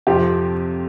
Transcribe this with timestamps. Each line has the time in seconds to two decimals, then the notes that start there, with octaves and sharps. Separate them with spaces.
0.07 F2 C3 F3 G4